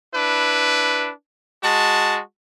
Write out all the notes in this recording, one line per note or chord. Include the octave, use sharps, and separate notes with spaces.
D4 E4 B4
G#3 F#4 A5